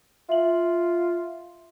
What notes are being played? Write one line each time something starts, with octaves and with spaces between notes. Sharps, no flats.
F4 E5 F#7